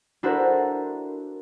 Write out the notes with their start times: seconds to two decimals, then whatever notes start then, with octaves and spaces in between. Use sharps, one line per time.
0.23 D4 E4 F#4 A4 A#4 C5